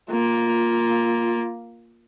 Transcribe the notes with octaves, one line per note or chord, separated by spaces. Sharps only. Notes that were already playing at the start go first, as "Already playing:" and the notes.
A#3 F4